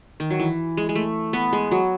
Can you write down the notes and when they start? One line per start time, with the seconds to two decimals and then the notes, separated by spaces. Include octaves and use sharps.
0.20 D#3
0.30 F#3
0.40 E3
0.77 G#3
0.89 G#3
0.95 A3
1.33 B3
1.53 G#3
1.71 F#3